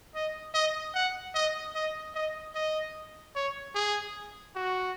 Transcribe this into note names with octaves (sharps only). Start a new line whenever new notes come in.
D#5
D#5
F#5
D#5
D#5
D#5
D#5
C#5
G#4
F#4